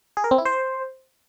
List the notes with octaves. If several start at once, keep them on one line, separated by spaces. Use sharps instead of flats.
G#4
A#4
C4
E4
C5